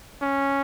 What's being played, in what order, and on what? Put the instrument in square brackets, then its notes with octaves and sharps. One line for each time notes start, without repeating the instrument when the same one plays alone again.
[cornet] C#4